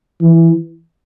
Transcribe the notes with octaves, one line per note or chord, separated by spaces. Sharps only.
E3